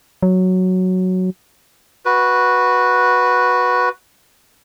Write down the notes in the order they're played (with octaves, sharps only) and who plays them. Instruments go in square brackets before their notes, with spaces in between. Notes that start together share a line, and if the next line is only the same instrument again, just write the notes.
[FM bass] F#3
[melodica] F#4 B4